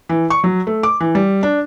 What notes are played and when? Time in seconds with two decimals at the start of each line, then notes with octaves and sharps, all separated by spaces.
0.09 E3
0.30 C#6
0.44 F#3
0.67 A3
0.83 D6
1.00 E3
1.15 G3
1.43 D4